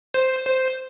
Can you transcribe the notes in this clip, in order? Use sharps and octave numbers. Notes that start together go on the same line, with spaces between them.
C5
C5